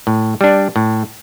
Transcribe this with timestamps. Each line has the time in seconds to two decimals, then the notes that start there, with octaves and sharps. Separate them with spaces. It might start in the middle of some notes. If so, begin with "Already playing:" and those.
0.07 A2
0.41 G3 D4
0.76 A2